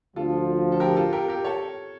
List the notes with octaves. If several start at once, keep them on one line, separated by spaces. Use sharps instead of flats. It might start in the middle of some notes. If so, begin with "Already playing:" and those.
D2 D3 F3 F4 A4
A4
G4 A#4
F4 A4
G4 A#4
G4 A#4
A4 C#5